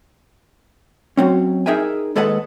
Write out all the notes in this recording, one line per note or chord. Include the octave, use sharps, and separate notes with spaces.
F#3 C4 C#4
D#4 G#4 A#4 E5 G5 G#5
D#2 G#3 A4 B4 D#5 F#5